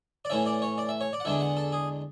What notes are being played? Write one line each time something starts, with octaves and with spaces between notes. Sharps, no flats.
D5
A2 E3 A3 C#4 E5
D5
C#5
D5
E5
C#5
D5
F#5
E2 D3 G#3 D4 E5
F#5
A4
G#4